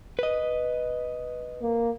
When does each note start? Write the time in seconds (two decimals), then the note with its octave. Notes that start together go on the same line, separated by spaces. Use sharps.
0.19 B4 D#5
1.62 A#3